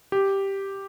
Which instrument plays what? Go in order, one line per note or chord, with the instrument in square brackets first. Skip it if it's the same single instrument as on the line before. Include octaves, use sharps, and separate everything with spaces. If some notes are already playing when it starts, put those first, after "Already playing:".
[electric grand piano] G4